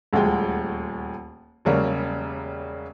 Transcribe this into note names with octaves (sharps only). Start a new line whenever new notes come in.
D#1 D2 F3 G#3 G5
E1 C#3 F#3 G3 A#3 A#4